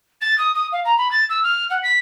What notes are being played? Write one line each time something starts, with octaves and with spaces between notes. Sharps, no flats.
A6
D#6
D#6
F5
A#5
B5
A6
E6
F6
F#5
B6